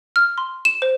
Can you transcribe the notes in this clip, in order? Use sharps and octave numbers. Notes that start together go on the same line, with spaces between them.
F6
C6
E7
C5